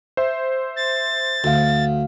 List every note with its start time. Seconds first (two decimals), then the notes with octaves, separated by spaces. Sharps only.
0.17 C5 E5 C6
0.76 A6
1.44 D2 F#4 F5